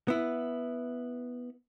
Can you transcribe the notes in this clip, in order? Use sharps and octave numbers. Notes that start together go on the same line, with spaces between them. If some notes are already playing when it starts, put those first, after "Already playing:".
B3 E4